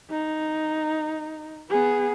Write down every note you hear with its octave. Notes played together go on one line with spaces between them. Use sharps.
D#4
B3 G#4